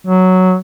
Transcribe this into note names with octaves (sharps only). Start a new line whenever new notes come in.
F#3